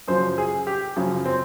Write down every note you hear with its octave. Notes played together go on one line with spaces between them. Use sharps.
F#2 C#3 F3 C5
G#4
G4
F#2 C#3 F3
C4